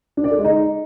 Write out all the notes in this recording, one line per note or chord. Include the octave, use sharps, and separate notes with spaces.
D4
D5
A4
G#3
D#4